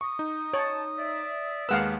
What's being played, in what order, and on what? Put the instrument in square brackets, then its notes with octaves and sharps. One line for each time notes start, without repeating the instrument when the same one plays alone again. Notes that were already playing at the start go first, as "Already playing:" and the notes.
[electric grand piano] C#6 [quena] D#6
[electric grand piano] D#4
[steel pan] C#5 [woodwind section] A5
[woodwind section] D5 E5
[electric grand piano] D#2 G#3 B4 [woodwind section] B3 A#4 [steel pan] F5 F#5 E6